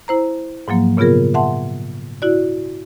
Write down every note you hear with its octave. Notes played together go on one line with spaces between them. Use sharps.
E4 C5 A#5
G#2 F3 F#3 A#3
A#2 C#3 B3 F4 G#4 A#4
E5 F#5 A5 C6
E4 F#4 D5